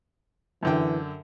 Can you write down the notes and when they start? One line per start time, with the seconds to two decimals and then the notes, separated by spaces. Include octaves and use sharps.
0.63 F#2 D3 E3 G5